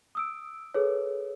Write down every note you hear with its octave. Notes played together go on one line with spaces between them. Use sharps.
D#6 E6 D7
G#4 A4 B4 C#5